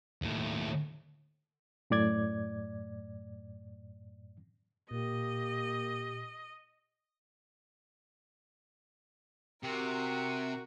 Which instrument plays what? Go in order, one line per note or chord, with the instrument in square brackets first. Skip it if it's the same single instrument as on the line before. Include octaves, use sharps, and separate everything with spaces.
[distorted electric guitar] D#2 A2
[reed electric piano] F#2 A2 D5 G#6
[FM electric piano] A#2 [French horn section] A#3 [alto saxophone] G4 [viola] D#5
[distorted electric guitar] C3 [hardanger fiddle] F#4 A#4